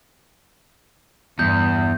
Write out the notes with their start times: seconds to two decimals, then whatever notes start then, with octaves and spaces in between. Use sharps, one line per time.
1.39 E2 G2 G6